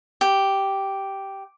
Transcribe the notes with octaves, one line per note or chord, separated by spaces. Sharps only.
G4